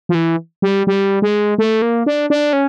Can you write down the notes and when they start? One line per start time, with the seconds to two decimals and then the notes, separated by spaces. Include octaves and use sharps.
0.09 F3
0.15 E3
0.62 G3
0.87 G3
1.22 G#3
1.58 A3
1.82 A#3
2.06 D4
2.30 D4
2.53 C#4